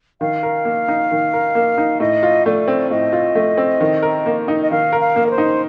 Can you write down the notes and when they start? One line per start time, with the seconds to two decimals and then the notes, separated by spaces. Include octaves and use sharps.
0.21 D#3 F5
0.43 A#4
0.65 A#3
0.88 D#4
1.11 D#3
1.33 A#4
1.55 A#3
1.78 D#4
2.00 A2 D#5
2.23 F4
2.46 A3 D5
2.68 C4
2.90 A2 D#5
3.13 F4
3.35 A3
3.58 C4
3.80 D#3
4.03 A#4
4.26 A#3
4.48 D#4
4.62 D#5
4.71 D#3 F5
4.93 A#4
5.01 F5
5.16 A#3
5.26 A#4
5.30 C5
5.38 D#4